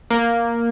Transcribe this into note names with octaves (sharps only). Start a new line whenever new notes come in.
A#3